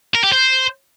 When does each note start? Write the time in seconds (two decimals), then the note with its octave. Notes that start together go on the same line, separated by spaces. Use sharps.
0.15 A#4
0.24 G4
0.32 C5